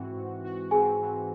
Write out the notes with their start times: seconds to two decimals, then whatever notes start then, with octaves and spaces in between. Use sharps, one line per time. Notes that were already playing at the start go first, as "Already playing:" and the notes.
Already playing: G#2 E3 C4 F#4
0.15 G#2
0.44 F#4
0.71 C4 G#4 G#5
1.01 E3